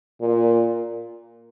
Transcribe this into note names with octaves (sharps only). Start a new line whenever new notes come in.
A#2